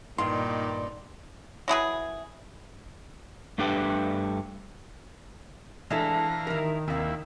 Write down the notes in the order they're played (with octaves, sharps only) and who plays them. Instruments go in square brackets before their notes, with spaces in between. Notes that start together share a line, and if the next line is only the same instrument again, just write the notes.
[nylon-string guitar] G2 [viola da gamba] A#2 D#4 D5 [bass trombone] D#3 [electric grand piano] C6
[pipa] F#3 E4 G#4 B4
[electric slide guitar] G2 A3 D4 G4 B4 G5
[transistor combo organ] E3 F5 A#5 [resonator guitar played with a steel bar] G#3 E4 A4 [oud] D4
[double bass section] D#3 [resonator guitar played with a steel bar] E4 A#4
[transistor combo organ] D#2 E4 [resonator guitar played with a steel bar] C3 A#3